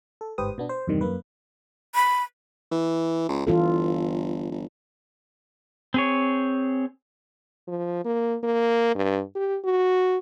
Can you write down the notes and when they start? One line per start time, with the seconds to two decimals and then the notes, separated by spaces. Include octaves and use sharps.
0.21 A4
0.38 G1 G#2 G4 B4 C5 D#6
0.58 B2 B3 D4
0.69 C5
0.87 E2 G2 C3 D#3 G3
1.01 F#2 A#3 B4
1.95 B5
2.72 E3
3.29 C#2
3.47 G1 E3 F4 A4
4.52 G1
5.94 C4 G#4 C#5
7.68 F3
8.05 A#3
8.43 A#3
8.95 G2
9.35 G4
9.65 F#4